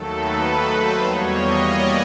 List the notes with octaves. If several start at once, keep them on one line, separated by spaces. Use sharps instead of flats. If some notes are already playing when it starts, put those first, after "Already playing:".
Already playing: D#2 D#3 F#3 A3 A4
B4
C5
E2 B2 G3 A#3 C#5
D#5
D5